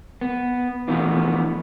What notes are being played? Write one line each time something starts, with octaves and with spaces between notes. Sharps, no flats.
B3
E3 F3 A3 B3 D4 F4